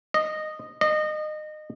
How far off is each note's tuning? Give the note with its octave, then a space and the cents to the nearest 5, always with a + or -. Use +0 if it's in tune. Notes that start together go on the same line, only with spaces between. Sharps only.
D#5 -10
D#5 -25